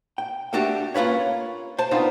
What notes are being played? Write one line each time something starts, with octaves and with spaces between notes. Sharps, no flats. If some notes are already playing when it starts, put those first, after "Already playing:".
G5
A3 D4 F#4 G4 A4 E5
A#3 C#4 F4 B4 C#5
C5 A5
B3 C4 D4 D#4 F4 C5